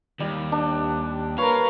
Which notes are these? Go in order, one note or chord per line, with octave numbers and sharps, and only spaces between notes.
D#2 G3
D4
A#4 B4 C#5 F5